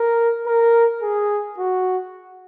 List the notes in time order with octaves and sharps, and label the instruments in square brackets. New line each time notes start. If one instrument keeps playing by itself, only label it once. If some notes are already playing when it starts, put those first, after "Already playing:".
Already playing: [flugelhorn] A#4
A#4
G#4
F#4